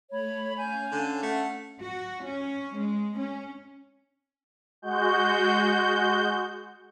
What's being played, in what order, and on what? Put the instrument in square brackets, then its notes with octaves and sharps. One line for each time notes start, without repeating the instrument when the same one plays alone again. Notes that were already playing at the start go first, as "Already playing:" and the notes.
[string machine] A3 [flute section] C#5 B5
[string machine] C#4 F5 [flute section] G#5 G6
[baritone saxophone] D3
[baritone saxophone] A3 [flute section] F#5
[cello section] F#4
C#4
G#3
C#4
[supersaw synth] G#3 F#4 G6